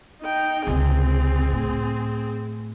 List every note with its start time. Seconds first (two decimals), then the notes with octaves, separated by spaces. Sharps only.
0.22 D#4 G5
0.67 C#2 C3 C4 G#4
1.53 A2